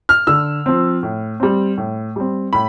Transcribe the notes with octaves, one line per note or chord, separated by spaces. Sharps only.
F6
D3 E6
F3 C4
A2
G3 C4
A2
G3 C4
A2 B5